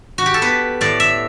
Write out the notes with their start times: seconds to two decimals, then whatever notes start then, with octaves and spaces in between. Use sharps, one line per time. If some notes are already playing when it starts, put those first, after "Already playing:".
0.18 F#4
0.26 G4
0.34 A4
0.42 B3 B4
0.81 A2 D5
1.00 E5